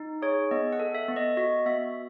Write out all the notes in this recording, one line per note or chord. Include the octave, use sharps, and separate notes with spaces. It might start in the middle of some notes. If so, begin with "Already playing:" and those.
Already playing: D#4
G#4 C#5
B3 D#5
F#5
A4
E5
B3
D#5
F#4 D#5
B3 E5